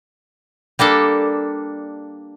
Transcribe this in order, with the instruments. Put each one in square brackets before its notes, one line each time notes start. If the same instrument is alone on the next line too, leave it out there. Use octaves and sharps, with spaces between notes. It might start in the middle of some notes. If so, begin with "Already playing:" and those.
[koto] G3 A#3 D4 A4